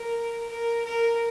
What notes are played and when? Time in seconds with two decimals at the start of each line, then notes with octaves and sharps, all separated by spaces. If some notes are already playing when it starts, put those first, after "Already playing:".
Already playing: A#4
0.48 A#4
0.85 A#4